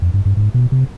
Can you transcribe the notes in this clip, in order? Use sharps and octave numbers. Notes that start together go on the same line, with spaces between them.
F2
G2
G2
G#2
B2
C3